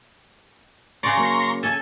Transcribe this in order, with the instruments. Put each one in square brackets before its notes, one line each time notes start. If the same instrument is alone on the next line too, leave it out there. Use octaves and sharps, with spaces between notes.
[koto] C#3 D5 [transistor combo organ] A#5 C6 C#6
[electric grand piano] F#3 A#3
[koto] A4 [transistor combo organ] G#5